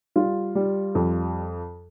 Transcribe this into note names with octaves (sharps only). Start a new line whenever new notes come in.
G3 F4
G3
F2